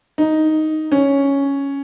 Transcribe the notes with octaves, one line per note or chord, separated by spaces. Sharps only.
D#4
C#4